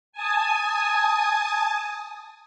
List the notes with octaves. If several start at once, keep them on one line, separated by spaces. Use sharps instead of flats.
G#5 A5 D#6